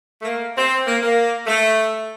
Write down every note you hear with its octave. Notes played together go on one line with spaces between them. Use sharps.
A3
A#3
C4
A#3
A#3
A3